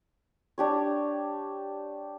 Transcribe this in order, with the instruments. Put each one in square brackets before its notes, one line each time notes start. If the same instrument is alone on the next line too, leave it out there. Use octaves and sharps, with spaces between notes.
[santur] D4 G4 C#5